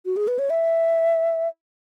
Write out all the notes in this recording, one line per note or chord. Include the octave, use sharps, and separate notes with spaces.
F#4
G#4
B4
C#5
E5